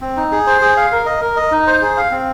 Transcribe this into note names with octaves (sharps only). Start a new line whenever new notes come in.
C4
D#4
G#4
C5
G#4
F5
A#4
D#5
A#4
D#5
D#4
C5
G#4
F5
C4